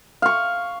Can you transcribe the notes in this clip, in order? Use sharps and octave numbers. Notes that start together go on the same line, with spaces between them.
F5 C#6